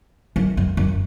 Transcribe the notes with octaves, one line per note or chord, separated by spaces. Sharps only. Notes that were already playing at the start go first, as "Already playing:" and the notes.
F#2
F#2
F#2